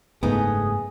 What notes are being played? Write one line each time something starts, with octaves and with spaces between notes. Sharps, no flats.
F#1 G#2 A3 B3 D#4 G#4